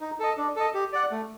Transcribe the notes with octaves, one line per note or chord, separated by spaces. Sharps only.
D#4
A4 D#5
D4
A4 D#5
G4
D5 F#5
A3